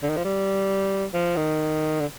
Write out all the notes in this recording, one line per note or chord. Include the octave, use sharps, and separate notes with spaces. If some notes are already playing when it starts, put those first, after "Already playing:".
D3
D#3
F3
G3
F3
D#3
D3